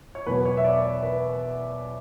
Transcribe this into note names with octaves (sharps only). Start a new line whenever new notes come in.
C#5
E2 B2 F#3 B3 B4
C#5
E5
D5
C#5
B4